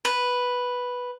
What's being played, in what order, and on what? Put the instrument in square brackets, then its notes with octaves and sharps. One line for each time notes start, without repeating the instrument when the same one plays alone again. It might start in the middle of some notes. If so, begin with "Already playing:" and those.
[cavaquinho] B4